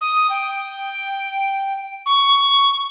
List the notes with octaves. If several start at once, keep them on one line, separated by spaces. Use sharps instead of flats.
D#6
G5
C#6